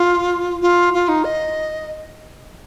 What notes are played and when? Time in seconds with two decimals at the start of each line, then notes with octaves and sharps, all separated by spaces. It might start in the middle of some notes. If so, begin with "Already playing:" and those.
Already playing: F4
0.61 F4
0.94 F4
1.08 D#4
1.24 D#5